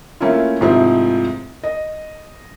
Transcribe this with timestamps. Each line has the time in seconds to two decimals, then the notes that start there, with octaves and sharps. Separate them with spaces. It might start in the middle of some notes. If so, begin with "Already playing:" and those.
0.20 A3 A#3 C#4 E4 F4
0.61 G#2 C3 F3 A3 C4 E4
1.64 D#5